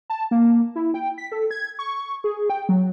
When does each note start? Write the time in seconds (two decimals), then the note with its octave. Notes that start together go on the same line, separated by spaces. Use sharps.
0.10 A5
0.31 A#3
0.75 E4
0.94 G5
1.18 B6
1.32 A4
1.51 G#6
1.79 C#6
2.24 G#4
2.50 G5
2.69 F#3